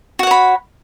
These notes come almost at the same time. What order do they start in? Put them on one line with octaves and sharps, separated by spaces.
F#4 F#5 C#5 B5